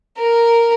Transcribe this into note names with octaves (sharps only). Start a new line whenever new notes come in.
A#4